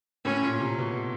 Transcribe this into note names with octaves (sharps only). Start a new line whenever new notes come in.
A2 C#4
A#2
C3
B2